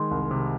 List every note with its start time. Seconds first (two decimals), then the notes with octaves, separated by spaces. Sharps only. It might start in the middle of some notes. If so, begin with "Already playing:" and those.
Already playing: D#3 G#3 C6
0.11 C2
0.31 C3